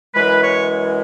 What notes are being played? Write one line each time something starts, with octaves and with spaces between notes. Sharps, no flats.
F#2 E3 G#3 B4
C#5